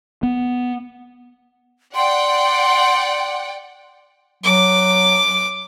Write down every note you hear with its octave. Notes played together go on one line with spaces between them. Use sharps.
B3
D5 F#5 G5 C6
F#3 D6